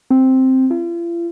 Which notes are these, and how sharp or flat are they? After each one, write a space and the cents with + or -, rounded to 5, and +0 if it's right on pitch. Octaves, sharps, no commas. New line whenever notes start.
C4 +0
F4 -45